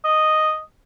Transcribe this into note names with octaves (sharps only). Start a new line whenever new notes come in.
D#5